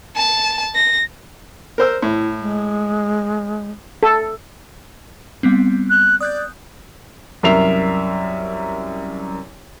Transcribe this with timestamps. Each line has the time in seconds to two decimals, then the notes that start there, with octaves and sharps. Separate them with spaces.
0.17 A5
0.75 A#6
1.78 A#4 C5 E6
2.02 A2 E4
2.39 G#3
4.03 A4
5.43 G3 B3 C4
5.90 F#6
6.21 D5 D#6 F#6 G6
7.43 C2 F#2 A#4 E5 C7 F7